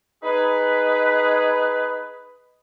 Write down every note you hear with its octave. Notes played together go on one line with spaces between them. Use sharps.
D#4 G#4 B4